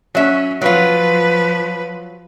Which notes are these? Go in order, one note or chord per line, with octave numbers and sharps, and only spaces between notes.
F#3 C#4 E5
F3 F#3 F4 B4